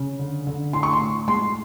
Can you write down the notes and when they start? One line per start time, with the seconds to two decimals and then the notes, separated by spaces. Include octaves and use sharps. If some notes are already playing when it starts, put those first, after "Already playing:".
Already playing: C#3
0.19 D3
0.47 D3
0.73 A2 C6
0.83 C#6
0.93 C6
1.01 A2
1.28 G#3 C6